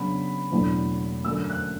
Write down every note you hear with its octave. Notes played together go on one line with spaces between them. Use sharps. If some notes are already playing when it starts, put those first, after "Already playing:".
Already playing: C#3 F#3 B3 D4 B5
E2 B2 F#3 A3 D4
F#2 D3 F#3 A3 D4 E6
F#6